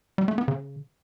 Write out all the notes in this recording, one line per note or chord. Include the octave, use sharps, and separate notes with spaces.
G3
A3
B3
C#3